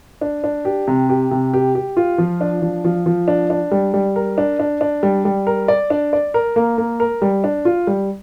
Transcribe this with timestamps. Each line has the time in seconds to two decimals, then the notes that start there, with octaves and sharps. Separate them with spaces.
0.21 D4
0.44 D4
0.65 G4
0.88 C3
1.09 G4
1.31 C3
1.53 G4
1.75 G4
1.97 F4
2.18 F3
2.41 D4
2.62 F3
2.85 F3
3.06 F3
3.28 D4
3.50 D4
3.71 G3
3.94 G3
4.16 A#4
4.38 D4
4.59 D4
4.81 D4
5.03 G3
5.25 G3
5.47 A#4
5.68 D5
5.90 D4
6.13 D5
6.34 A#4
6.56 A#3
6.78 A#3
7.00 A#4
7.22 G3
7.44 D4
7.65 F4
7.87 G3